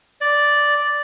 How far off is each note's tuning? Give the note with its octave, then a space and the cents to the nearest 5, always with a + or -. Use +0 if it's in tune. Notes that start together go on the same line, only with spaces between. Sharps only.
D5 -5